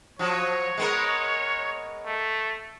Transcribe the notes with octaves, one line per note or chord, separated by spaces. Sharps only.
F3 F#3 C#5
G#3 B3 A#4
A3